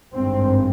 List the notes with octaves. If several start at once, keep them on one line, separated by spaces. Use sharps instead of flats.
G#1 G2 C4